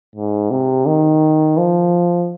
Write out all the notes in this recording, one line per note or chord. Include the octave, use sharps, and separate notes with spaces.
G#2
C3
D#3
F3